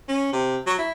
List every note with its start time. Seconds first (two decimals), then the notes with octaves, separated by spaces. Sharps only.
0.08 C#4
0.33 C3
0.66 F#3
0.78 E4